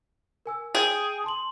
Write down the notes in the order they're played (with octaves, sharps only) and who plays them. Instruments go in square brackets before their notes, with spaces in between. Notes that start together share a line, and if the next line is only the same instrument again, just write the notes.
[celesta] A#4 G#5 E6
[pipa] G#4 [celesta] G5 G6 D7
[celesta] A5 C6 F#7